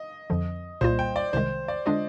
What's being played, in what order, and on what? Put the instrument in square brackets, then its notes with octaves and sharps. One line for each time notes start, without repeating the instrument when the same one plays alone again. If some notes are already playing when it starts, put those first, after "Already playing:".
Already playing: [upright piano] D#5
[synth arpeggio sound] F2 D3 F3
[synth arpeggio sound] C2 A#2 G3 A#3 F4 [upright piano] C5
[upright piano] G5
D5
[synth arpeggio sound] C2 C3 D#3 G#3 [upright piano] C5
[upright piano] D5
[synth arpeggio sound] D3 G#3 D4 F4 [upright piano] D#5